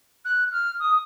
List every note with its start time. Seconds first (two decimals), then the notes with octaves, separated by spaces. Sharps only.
0.25 F#6
0.52 F6
0.79 D#6